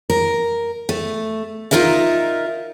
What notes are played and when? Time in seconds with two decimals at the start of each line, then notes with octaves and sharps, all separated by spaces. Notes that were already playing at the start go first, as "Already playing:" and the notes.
0.10 A#4
0.89 A3
1.71 D#4 F4 A#4 D#5 E5